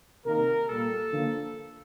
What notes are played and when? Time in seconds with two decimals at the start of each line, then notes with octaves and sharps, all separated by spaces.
0.25 C3 D#3 A#3 A#4
0.68 A#2 G3 A#3 A4
1.11 D3 F3 A#3